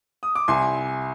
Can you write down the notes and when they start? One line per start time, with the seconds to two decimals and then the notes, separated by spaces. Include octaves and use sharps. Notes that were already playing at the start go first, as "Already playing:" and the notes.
0.23 D#6
0.35 D6
0.48 C2 G#5 C6